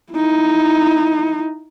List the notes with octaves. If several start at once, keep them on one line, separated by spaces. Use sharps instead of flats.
D#4 E4